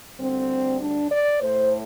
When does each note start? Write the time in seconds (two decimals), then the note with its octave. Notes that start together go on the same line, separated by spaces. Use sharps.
0.19 D2 D3 G3 C4
0.80 D4
1.10 D5
1.41 A2 A3 C5